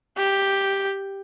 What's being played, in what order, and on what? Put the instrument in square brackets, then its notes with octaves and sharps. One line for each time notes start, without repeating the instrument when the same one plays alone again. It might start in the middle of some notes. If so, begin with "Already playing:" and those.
[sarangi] G4